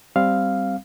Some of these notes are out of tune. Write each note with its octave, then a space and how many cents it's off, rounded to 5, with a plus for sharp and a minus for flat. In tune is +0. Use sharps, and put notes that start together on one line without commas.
G3 +0 C4 +0 F5 +0